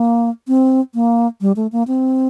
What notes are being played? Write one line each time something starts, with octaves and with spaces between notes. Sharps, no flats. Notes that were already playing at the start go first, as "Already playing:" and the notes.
Already playing: A#3
C4
A#3
G3
A3
A#3
C4